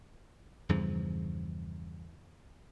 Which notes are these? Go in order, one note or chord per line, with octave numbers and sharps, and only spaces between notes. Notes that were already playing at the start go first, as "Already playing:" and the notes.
E2 G2 C#3 F3